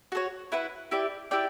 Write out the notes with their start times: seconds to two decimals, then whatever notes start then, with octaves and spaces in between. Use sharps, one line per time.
0.12 F#4 A4 C#5
0.52 E4 B4 F#5
0.91 E4 G4 D5
1.31 E4 G4 D5 G5